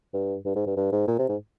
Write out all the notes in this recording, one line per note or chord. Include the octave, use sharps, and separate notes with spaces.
G2
G2
G#2
G2
G2
G#2
A#2
C3
G#2